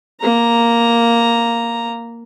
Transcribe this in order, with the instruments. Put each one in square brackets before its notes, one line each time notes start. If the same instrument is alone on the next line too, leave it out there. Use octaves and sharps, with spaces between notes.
[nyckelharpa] A#3 A#5